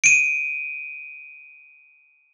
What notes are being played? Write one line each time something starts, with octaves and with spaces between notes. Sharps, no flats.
D7 D#7